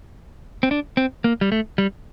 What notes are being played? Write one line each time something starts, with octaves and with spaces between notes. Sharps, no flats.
C4
D4
C4
A#3
G3
A3
G3